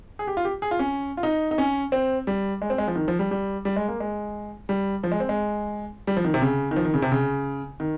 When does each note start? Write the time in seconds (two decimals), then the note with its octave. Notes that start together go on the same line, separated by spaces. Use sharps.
0.19 G#4
0.27 G4
0.37 F4
0.45 G4
0.62 G#4
0.71 F4
0.79 C#4
1.17 F4
1.23 D#4
1.51 D#4
1.58 C#4
1.92 C4
2.27 G3
2.62 G#3
2.70 C4
2.78 G#3
2.88 F3
2.95 D#3
3.08 F3
3.19 G3
3.31 G3
3.65 G3
3.76 G#3
3.88 A#3
4.00 G#3
4.69 G3
5.03 F3
5.12 G#3
5.20 C4
5.29 G#3
6.07 G3
6.17 F3
6.25 D#3
6.34 C3
6.42 C#3
6.71 D#3
6.76 F3
6.85 D#3
6.94 C#3
7.02 C3
7.12 C#3
7.80 D#3